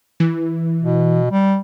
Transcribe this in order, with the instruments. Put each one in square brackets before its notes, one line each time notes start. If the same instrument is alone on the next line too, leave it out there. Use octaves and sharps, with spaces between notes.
[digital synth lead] E3
[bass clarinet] B2
G3